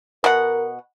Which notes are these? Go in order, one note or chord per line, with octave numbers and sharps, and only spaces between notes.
B2 A#4 F#5